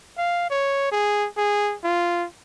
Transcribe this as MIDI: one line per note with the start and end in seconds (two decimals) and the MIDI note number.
0.18 0.50 77
0.50 0.89 73
0.92 1.28 68
1.37 1.76 68
1.84 2.26 65